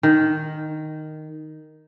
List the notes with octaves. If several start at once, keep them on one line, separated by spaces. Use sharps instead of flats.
D#3